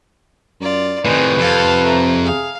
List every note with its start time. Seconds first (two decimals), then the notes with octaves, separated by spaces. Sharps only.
0.61 F#2 F4 D5
1.05 A2 C3 D#3 G#3 B4
1.39 F2 A4 F5
1.84 A3 A#5
2.24 G#4 F5